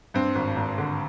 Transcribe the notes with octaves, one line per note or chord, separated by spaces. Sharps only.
G2 C4
G#1
G#1
D3